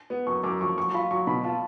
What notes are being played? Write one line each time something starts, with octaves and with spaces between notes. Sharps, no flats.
B3
F#2 C#6
F#2 D6
F3 C#6
F#3 C#6
F4 B5
F#3 C#6
B2 B5
F4 A5